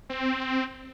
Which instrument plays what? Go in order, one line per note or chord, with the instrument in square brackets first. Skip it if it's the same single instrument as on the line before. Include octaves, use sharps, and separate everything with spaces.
[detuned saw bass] C4